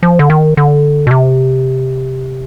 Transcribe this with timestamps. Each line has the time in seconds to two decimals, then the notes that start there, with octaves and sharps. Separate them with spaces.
0.03 F3
0.19 D3
0.30 D#3
0.57 D3
1.07 B2
1.11 C3